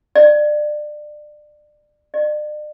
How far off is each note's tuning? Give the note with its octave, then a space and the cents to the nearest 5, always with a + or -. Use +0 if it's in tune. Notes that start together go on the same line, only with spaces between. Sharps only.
D5 +25
D5 +45